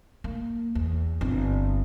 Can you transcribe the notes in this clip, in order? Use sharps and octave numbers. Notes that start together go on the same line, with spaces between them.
A#3
E2
G1 C4